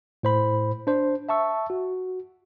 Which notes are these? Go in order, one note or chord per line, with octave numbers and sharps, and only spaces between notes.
A2 C5 B5
D4 C5
E5 A5 C#6 E6
F#4